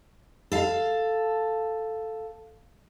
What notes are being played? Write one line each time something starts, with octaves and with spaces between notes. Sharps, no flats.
A4 F5